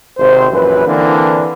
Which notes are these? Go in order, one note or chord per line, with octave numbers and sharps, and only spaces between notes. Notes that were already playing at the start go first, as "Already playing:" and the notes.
G#1 C3 C5
A#1 F#2 E3 B4
D3 E3 A#3 C4 D4